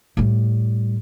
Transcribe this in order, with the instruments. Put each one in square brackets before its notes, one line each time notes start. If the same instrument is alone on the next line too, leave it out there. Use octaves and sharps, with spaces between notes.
[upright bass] A2 G3